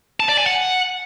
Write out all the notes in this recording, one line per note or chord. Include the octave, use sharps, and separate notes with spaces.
A5
D5
G#5
F#5